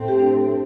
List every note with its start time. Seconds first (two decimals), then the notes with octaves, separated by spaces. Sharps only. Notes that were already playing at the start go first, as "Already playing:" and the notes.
Already playing: A2 A3 C4
0.08 G4
0.20 D4